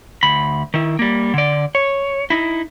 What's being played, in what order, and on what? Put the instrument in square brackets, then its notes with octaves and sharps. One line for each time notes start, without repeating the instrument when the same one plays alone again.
[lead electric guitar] D2 B5
D#3 E4
G3 A#3
D3 D5
C#5
D#4 E4